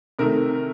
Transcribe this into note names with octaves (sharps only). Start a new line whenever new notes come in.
C3 D#3 A3 A#4